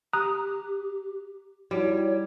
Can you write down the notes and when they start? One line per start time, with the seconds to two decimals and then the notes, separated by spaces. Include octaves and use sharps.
0.13 G4 A#5 D#6 F#6
1.71 G3 D#4 E4 F#4 C#5